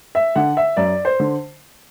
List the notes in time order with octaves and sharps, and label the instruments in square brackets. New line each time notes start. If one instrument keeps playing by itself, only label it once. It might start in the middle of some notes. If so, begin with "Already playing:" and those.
[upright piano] E5
D3 F#5
E5
F#2 D5
C5
D3